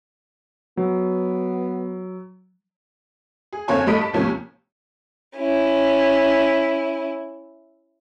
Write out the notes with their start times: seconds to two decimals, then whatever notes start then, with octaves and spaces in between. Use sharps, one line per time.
0.77 F#3 B3
3.53 G#4
3.68 F#1 D3 C4 C#5 F5 G#5
3.87 G2 A3 D#5 B5 B6 D7
4.01 A5
4.13 D#2 A2 C3 F3 A#3 C#4
5.36 C#4 E4